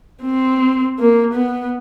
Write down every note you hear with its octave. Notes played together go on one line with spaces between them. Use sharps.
C4
A#3
B3